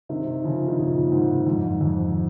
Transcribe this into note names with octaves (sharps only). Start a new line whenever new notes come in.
C3 D#3
C#3 F3
D#3
A#2 C#3
G#2 C3
F2 G#2
F2